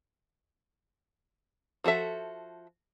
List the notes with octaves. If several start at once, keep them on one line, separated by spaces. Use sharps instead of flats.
F3 F#4 A4 E5